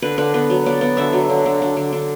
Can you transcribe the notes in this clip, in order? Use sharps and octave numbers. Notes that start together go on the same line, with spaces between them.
D3 B4
D3 B4
B3 B4
F#3
B3 D5
B3
D3 E5
F#3
D3
D3
D3
D3
D3